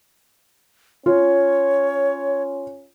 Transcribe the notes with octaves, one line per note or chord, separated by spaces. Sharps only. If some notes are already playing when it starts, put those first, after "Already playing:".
C#4 F4 C#5